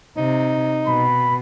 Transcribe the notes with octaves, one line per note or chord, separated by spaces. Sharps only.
C3 D#4
B2 B5